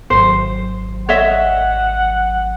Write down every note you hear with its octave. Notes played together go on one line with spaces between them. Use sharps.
G#1 F#3 C5
C#5 D#5 E5 F#5